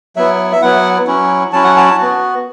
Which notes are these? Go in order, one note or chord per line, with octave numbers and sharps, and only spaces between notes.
F#3 B3 E4 E5
E5
F#3 B3 E4 F#5
F#3 C#4 E4
F#3 C#4 E4 A5
F#5
A5
B3 F#4